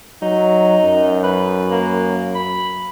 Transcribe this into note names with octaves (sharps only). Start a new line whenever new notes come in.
F#3 D#4
F#2
B4
A#3
B5